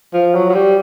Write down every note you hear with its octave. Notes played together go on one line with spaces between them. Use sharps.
F3
F#3
F#3
G3